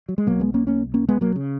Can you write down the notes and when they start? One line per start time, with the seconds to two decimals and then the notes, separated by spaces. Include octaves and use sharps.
0.09 F#3
0.18 G#3
0.27 B1 B2 F#3 A#3
0.40 G#3 B3
0.54 A#3 C#4
0.67 A#3 C#4
0.94 A#3 C#4
1.09 G#3 B3
1.21 F#3 A#3
1.36 C#3